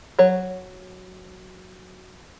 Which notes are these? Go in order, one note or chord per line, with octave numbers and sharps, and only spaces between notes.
F#3 C#5